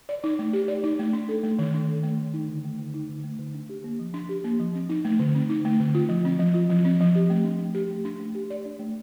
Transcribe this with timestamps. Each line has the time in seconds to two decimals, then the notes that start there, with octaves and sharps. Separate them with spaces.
0.09 D5
0.24 D#4
0.39 A3
0.53 G4
0.68 D5
0.84 D#4
0.99 A3
1.13 D4
1.29 A4
1.43 A3
1.59 D#3
1.74 D4
1.89 A4
2.04 A3
2.19 D#3
2.34 D#4
2.48 D3
2.65 A3
2.79 D3
2.94 D#4
3.09 D3
3.24 A3
3.39 D3
3.54 D4
3.69 G4
3.84 A#3
3.99 F3
4.14 D4
4.29 G4
4.44 A#3
4.60 F3
4.75 C4
4.89 D#4
5.05 A3
5.19 D3
5.35 C4
5.50 D#4
5.65 A3
5.80 D3
5.95 F4
6.09 F3
6.25 C4
6.39 F3
6.54 F4
6.70 F3
6.85 C4
7.00 F3
7.15 G4
7.30 A3
7.45 D4
7.59 A3
7.74 G4
7.90 A3
8.05 D4
8.20 A3
8.35 G4
8.50 D5
8.65 D4
8.79 A3